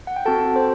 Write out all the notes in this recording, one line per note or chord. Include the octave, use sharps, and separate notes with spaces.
F#5
G5
C4 F#4 A4 A5
C5